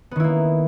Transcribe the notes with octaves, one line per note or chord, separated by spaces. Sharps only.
D#3 A#3 B3 E4